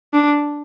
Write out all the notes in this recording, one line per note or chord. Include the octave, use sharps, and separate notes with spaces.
D4